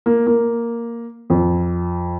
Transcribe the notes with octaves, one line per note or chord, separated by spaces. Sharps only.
A#3
A#3
F2